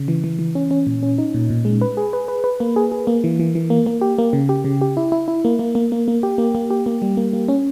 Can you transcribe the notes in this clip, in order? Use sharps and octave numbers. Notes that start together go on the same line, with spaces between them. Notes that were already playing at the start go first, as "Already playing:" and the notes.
Already playing: C#3
E3
E3
E3
C#4
C#4
A#2
C#4
D#4
A#2
A#2
G#3
B4
G#4
B4
B4
B4
A#3
G#4
G#4
A#3
E3
E3
E3
A#3
A#3
G4
A#3
C#3
G4
C#3
G4
E4
E4
E4
A#3
A#3
A#3
A#3
A#3
G4
A#3
A#3
G4
A#3
G3
A#3
A#3
C#4